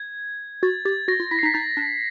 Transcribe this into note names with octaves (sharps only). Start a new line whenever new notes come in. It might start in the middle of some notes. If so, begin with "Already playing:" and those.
Already playing: G#6
F#4 A6
G4 A6
F#4 A#6
F4
E4 B6
C7
D#4
B6
D#4 A6
D4